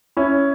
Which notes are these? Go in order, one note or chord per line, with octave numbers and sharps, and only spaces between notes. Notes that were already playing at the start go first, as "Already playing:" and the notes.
C#4 E4